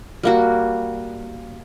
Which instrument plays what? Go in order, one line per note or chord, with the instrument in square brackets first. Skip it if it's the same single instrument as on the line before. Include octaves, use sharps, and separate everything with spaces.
[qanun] G3 A#3 F#4